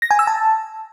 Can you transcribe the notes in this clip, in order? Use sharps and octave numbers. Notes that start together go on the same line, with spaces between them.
A#6
G#5
E6
A5